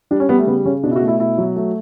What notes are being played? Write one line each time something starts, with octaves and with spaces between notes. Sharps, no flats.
G3 D4
C#4
G3 B3
A3
C#3 B3
C#3 C#4
B2 D4
E4
F#4
A3
E4
B2 E4
F#3
A3